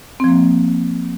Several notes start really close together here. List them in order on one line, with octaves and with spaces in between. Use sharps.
C4 F3 A#3